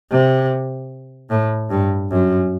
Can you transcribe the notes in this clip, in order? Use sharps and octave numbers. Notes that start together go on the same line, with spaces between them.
C3
A2
G2
F#2